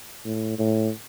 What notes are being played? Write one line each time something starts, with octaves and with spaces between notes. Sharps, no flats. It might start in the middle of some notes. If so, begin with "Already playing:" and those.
A2
A2